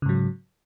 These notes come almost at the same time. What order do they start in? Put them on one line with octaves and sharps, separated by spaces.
C#3 G#2 F#3